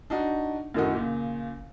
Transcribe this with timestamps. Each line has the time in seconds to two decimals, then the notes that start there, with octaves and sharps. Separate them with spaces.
0.10 D4 D#4 F#4
0.74 F#2 A2 D#3 D#4 F#4
0.94 A#2 C#3